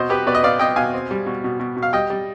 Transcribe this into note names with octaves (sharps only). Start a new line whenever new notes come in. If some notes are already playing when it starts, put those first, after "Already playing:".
Already playing: B2 C4 C5 D#5
B3 G4 B4
B2 B4 D5
D#5
B3 D5 F5
B3 D#5 G5
B2 F5 G#5
C4
G3
B2
B2
B2
B2
F5
G3 D#5 G5
G3